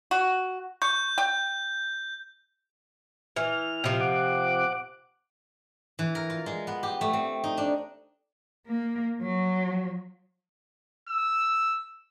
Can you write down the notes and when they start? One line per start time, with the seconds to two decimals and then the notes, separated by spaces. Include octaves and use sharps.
0.11 F#4
0.82 C#6 G6
1.18 G5
3.36 E3 F6
3.84 C3 F3
4.00 F#5 D6
5.99 E3
6.15 A#4
6.30 F4
6.46 G#3
6.67 B3
6.83 G4
7.01 A3
7.13 C4
7.44 D#4
7.58 D4
8.67 A#3
9.22 F#3
11.09 E6